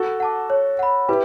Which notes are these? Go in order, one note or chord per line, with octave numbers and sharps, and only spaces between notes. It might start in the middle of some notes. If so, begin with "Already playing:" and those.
Already playing: F#4 A4
F#5 A5 D6
C#5
F#5 B5
E4 G4 B4